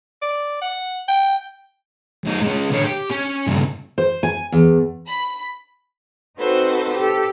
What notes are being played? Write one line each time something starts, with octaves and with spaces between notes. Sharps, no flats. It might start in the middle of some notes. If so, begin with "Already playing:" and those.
D5
F#5
G5
F#2 D#4
G#3 C#4
D3 C#5
G4
C#4
G2 C#3
C5
G#5
E2
B5
C4 D#4 F#4 A4 B4 C5
G4 A4